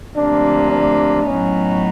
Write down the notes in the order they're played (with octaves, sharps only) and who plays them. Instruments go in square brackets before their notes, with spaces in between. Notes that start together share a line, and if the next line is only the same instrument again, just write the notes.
[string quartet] D2 C3 F3 A#3 [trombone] D4
[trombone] D4
[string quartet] A2 F#3 B3 D#4 F#4 [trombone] C#4